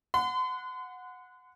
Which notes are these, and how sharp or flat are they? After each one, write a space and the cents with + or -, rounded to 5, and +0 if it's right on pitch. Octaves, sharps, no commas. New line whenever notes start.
F#5 -15 C6 -40